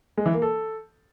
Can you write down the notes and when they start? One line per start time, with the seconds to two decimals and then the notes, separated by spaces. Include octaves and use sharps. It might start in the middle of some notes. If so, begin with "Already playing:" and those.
0.17 G#3
0.26 E3
0.34 A#3
0.42 A4